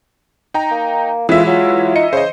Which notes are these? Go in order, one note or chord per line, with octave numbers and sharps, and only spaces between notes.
D#4 G5 A#5
A#3
A2 E3 G#3 E4 F4 E5
F#3 F4
D#4 D#5 C#7
C#3 C5 D#5